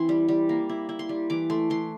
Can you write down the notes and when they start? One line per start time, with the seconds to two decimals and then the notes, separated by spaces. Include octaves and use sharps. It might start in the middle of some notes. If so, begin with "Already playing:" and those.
Already playing: E3 C4 E4 C6
0.09 G3
0.28 G3
0.49 A#3
0.69 E4
0.89 E4
0.99 C6
1.09 G3
1.30 E3 D6
1.50 A3 C6
1.70 E3 C6